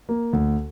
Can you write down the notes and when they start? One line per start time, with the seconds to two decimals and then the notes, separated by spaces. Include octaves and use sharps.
0.09 A#3
0.33 D2